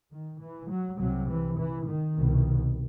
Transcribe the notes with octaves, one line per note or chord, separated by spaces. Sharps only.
D#3
E3
F#3
C2 C3 F#3
E3
E3
D#3
C2 B2